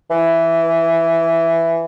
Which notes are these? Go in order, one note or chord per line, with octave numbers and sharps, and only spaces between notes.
E3